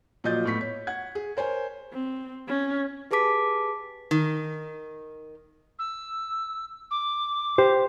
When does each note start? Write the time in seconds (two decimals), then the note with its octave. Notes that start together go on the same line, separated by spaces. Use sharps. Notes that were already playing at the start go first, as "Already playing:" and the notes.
0.24 A#2 F3 F#3 D#5 G6 A6
0.45 A2 B3 C#6 B6
0.61 C#5
0.87 F#5 G#6
1.15 G#4
1.37 A#4 C5 C#5 G#5
1.92 C4
2.48 C#4
3.11 G4 G#4 B4 A5 D6 B6
4.11 D#3
5.79 E6
6.91 D6
7.58 G4 C5